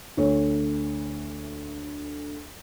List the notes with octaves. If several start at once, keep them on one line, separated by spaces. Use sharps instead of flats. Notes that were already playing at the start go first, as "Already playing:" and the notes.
D2 A3 C#5